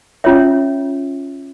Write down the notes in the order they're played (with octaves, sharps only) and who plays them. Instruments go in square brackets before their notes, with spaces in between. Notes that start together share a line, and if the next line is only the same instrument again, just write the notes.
[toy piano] C#4 F4 C#5 E5